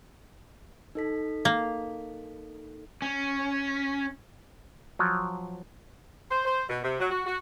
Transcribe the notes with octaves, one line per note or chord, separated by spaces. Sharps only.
D#4 A4 B6
A#3
C#4
F3 F#3
C5
C5
B2
C3
F#3
F#4
F#4